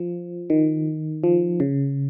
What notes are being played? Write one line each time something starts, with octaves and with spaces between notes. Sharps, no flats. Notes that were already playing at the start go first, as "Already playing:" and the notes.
Already playing: F3
D#3
F3
C#3